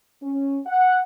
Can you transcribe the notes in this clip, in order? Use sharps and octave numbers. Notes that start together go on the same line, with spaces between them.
C#4
F#5